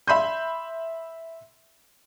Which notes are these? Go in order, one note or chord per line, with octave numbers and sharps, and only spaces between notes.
E5 B5 C6 G6